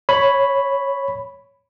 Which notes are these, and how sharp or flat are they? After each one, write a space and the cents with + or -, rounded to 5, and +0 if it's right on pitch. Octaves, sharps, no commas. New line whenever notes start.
C#5 +0 B5 +0